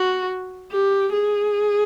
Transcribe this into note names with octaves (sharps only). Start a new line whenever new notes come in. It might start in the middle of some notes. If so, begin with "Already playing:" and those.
Already playing: F#4
G4
G#4